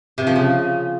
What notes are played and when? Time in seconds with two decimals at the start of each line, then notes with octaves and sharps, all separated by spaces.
0.18 C3
0.27 F3
0.36 C#3